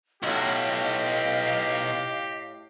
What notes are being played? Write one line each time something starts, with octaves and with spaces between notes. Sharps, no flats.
B1 A2 F#4 G4 D#5 F5